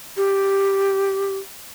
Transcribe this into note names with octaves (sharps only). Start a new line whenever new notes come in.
G4